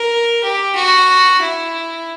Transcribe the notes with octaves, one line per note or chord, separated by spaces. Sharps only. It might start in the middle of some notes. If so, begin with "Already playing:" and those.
Already playing: A#4
G4
F#4
E4